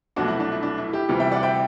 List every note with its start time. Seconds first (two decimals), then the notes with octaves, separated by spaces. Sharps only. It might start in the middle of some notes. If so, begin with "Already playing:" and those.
0.16 C2 B2 F#3 A3 D4 F#4
0.28 E4
0.40 D4
0.52 E4
0.63 D4
0.78 E4
0.93 E4 G4
1.09 D2 C3 E3 G3
1.20 E5 G5
1.32 D5 F#5
1.43 E5 G5